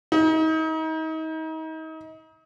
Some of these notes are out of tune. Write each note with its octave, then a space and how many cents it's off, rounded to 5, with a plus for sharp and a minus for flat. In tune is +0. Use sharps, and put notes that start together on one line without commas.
D#4 +35